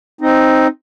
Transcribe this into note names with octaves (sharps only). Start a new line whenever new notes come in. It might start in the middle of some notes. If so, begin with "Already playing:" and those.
C4 D#4